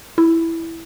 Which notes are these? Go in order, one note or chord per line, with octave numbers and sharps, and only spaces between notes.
E4